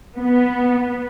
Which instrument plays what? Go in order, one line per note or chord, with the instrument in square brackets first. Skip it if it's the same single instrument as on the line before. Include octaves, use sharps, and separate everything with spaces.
[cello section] B3